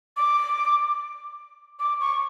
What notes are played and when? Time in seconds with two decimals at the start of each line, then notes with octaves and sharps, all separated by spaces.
0.17 D6
1.79 D6
2.00 C#6